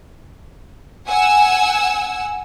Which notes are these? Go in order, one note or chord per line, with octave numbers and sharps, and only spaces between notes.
F#5 G#5 E6